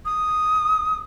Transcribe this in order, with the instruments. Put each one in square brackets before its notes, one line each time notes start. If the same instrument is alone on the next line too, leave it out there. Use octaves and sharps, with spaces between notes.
[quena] D#6